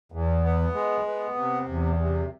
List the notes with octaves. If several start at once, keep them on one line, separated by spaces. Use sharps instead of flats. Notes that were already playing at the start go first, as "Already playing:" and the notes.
E2
B3
G#3
B3
C3
E2
C3